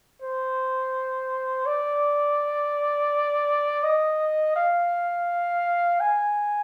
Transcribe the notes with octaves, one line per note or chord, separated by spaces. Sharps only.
C5
D5
D#5
F5
G#5